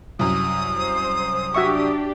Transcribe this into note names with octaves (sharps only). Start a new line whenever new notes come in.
C2 F#2 D#6
C5
D4 F#4 G4 E5 C#6